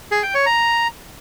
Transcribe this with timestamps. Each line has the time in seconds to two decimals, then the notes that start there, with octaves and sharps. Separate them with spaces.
0.11 G#4
0.23 G5
0.35 C#5
0.46 A#5